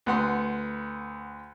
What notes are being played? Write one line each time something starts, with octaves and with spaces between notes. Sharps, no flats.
D2 B4 F#5 C6